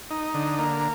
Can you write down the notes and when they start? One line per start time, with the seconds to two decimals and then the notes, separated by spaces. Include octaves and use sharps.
0.10 D#4
0.34 D3
0.59 A#3